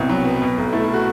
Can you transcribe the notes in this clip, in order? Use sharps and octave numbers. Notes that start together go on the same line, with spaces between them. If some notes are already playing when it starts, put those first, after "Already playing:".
Already playing: C2 B2 E4
F#3
B3
B2
B1
A3 E4
E4
F#4